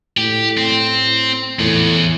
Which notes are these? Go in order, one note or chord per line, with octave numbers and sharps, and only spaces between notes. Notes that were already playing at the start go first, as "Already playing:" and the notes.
A2 G4
C4
E2 A2